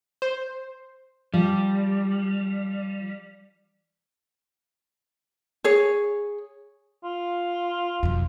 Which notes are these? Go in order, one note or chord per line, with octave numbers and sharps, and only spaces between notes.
C5
F3 G3
G#4 C#5
F4
B1 F2